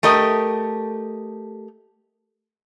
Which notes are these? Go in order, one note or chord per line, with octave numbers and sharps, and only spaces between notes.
A3 G4 A#4 D#5